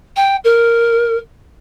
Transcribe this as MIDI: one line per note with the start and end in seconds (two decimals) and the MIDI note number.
0.16 0.36 79
0.44 1.18 70